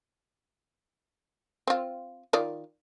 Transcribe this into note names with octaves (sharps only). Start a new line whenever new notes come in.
C4 F4
D#3 F4 D5